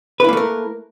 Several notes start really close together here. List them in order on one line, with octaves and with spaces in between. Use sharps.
B4 E4 A#3 A3 A#4